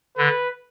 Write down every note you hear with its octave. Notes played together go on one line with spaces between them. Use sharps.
D3 B4